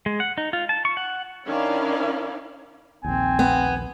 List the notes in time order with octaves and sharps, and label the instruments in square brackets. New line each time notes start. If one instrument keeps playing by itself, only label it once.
[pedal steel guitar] G#3
F#5
D#4
F4
A5
C#6
F#5
[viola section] D#3 C#4 D4 E4 D5 F5
[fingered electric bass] A#1 D#2 [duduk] C4 [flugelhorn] G#5
[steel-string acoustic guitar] B3